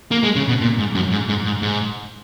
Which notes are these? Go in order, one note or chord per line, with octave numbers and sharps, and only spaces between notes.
A#3
G#3
C#3
B2
A#2
G#2
F#2
G#2
G#2
G#2
G#2